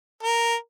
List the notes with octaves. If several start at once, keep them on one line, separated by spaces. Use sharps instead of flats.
A#4